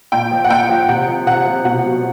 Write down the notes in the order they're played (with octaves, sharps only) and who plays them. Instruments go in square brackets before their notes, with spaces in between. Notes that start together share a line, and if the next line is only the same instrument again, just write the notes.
[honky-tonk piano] A#2 G5
F3
F#5
A#2 G5
F3
C3 F#5
F3
C3 F#5
F3
B2 F#5
F#3